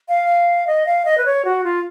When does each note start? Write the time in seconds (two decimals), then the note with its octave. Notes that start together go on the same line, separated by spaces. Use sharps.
0.09 F5
0.67 D#5
0.86 F5
1.05 D#5
1.18 B4
1.25 C#5
1.45 F#4
1.64 F4